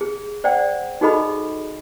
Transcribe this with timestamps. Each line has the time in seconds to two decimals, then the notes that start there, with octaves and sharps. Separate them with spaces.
0.01 G#4
0.44 C5 D5 F#5 G5
1.01 D#4 F#4 G#4 A4 D#5 B5